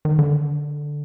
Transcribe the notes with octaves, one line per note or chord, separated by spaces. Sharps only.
D#3
D3